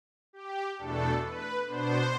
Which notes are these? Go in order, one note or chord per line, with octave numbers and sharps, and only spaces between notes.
G4
E2 B2 A3 D4 A4
B4
B2 B3 D4 C5